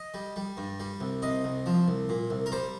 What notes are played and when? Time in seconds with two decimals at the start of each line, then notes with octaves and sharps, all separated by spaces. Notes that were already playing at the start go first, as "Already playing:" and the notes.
Already playing: D#5
0.14 G3
0.36 G3
0.57 G2
0.80 G3
1.01 C2
1.22 C3 D#5
1.44 C2
1.66 F3
1.88 C2
2.09 A#2
2.30 C2
2.46 A#4
2.52 G3 C5